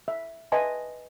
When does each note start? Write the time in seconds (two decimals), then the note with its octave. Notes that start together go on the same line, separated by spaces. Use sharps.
0.08 E5
0.52 B4 D#5 E5 G#5 A5 C6